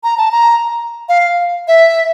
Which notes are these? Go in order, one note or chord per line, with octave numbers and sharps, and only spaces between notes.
A#5
A5
A#5
F5
E5